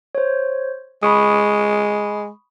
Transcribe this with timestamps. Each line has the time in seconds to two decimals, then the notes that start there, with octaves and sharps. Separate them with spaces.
0.15 C5 C#5
1.03 G#3 B5 C#6 D#6